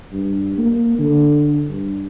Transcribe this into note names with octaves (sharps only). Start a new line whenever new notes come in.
G2
A#3
D3
G2